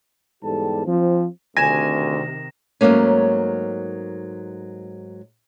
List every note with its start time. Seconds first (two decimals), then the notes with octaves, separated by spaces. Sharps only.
0.43 E2 G#2 G3 G4 A4 A5
0.87 F3 C4
1.57 D2 C3 D#3 G#5 A#6 E7
2.81 G#2 F#3 A3 A#3 C#4